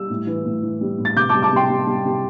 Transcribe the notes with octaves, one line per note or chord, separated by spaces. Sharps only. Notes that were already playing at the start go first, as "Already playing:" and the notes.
Already playing: G3 E6
A2
E3
A2
E3
G3
A2
A6
C3 D6 G6
G3 A5 D6
A5 D6
C3 G5 C6
G3
G3
C3